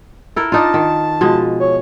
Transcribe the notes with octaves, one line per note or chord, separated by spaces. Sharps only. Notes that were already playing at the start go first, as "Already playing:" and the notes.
E4 A4 A#4
D4 D#4 F4 A5
D#3
B2 F3 G#3
C#5